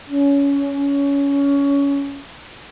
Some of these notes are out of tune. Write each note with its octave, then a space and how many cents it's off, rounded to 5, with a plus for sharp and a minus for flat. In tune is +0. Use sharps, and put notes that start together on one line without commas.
C#4 +20